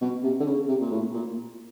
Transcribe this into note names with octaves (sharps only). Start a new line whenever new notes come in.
B2
C3
D3
C#3
C3
A#2
A2
A#2